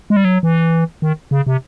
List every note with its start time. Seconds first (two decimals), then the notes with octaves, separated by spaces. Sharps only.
0.10 G#3
0.17 G3
0.25 F#3
0.43 E3
1.02 D#3
1.31 C#3
1.47 C3